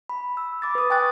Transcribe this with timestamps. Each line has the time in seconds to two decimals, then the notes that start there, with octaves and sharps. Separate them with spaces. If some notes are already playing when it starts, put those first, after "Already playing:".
0.09 B5
0.37 E6
0.62 B5 D6 A6
0.75 B4 D#6
0.90 G5 G#5 C#6 F#6 A6